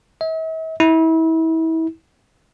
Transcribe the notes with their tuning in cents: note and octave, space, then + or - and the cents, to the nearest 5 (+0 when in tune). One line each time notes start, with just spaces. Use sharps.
E5 -45
E4 -30